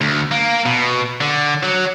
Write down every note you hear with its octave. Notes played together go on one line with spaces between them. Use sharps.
D2
A#3
B2
D3
F#3